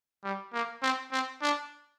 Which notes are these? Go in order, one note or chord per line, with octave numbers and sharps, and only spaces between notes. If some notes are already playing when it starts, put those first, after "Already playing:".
G3
A#3
C4
C4
D4